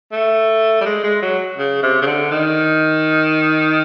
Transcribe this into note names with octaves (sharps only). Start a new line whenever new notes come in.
A3
G3
G#3
G#3
F#3
C#3
C3
C#3
D3
D#3